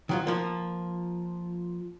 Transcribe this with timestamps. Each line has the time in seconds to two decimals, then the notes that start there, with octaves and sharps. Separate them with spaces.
0.09 D#3 F#3 F4
0.27 F3 A#3